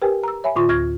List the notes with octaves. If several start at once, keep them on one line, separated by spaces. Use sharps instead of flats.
G4 A#4 B4 G5 G#5
A#5 E6
C#5 E5 G#5 B5
A2 D3 F4 C6 C#6
D2 C#6 F6 G#6 A#6